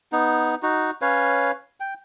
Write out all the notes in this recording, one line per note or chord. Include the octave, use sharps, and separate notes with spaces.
B3 D#4
D#4 F#4
C#4 B4 C#5 F5
G5